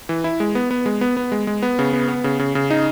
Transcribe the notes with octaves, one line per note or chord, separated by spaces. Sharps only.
E3
E4
G#3
B3
B3
G#3
B3
B3
G#3
G#3
B3
C#3
B3
B3
C#3
C#3
C#3
D#4